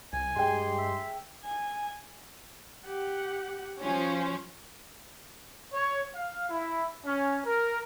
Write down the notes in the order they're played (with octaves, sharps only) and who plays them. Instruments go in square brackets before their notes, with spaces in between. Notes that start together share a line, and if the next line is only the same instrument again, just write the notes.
[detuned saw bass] C2 [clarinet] G#5
[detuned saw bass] G2 [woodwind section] G#3 G4 C6 [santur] G#4 G5
[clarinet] E5
[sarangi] G#5
[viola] G4 F#5
[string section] F3 C#4 [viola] F#4 C5
[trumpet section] C#5
F5
E4
C#4
A#4